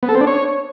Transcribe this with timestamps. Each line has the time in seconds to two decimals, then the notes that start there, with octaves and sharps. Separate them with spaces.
0.03 B3
0.09 A4
0.15 C4
0.21 D4
0.27 C#5